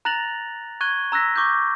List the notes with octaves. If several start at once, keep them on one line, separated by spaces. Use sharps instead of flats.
A#5 F#6 A6 A#6 F7 F#7
C#6 F#6 G#6 D#7 G7
A#5 E6 F#6 A#6 B6
C#6 D6 F#6 G6